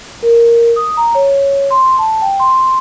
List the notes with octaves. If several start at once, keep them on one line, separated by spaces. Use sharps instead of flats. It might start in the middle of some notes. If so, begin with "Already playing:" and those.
A#4
D#6
A#5
C#5
C6
A5
G5
C6